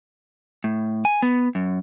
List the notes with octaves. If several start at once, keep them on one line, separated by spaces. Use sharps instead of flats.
A2
G#5
B3
F#2